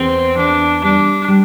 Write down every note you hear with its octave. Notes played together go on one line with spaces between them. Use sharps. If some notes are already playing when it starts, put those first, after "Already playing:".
Already playing: E2 C4
E2 D4
G3 D4
G3